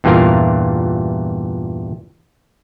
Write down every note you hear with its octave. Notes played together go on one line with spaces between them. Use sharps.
E2 G2 A#2 E3 F4 A#4